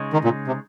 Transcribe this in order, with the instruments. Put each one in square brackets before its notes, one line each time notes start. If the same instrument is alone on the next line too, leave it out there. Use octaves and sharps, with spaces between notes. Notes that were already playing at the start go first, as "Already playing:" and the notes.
Already playing: [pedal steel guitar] C#3 G#3 D#4 G#4 C#5
[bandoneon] D#3
A#2
C3